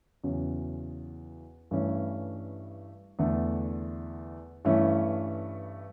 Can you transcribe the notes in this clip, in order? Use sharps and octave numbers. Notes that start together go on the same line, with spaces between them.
E2 C#3 F#3 C#4
G2 E3 A3 C#4
E2 D3 A3
G2 E3 A3 C#4 E4